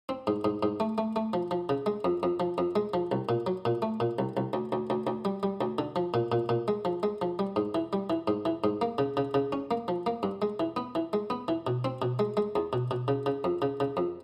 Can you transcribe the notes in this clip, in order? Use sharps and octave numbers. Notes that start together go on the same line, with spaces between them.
C4
G#2
G#2
G#2
A3
A3
A3
F3
F3
C#3
G#3
F2
F2
F3
F2
G#3
F3
C2
A#2
F#3
A#2
A3
A#2
C2
C2
D2
D2
D2
D2
G3
G3
D2
D3
F3
A#2
A#2
A#2
G#3
F3
G#3
F3
G3
G#2
E3
G3
E3
G#2
E3
G#2
A#3
C#3
C#3
C#3
C#4
A#3
F3
A#3
G2
G#3
E3
B3
E3
G#3
B3
E3
B2
C4
B2
G#3
G#3
E2
B2
B2
C#3
C#3
F2
C#3
C#3
F2